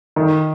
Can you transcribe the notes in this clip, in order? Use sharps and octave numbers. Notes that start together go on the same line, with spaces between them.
D#3